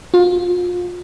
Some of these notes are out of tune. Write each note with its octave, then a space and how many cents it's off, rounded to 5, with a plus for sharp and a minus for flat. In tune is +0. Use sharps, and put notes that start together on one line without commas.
F4 +30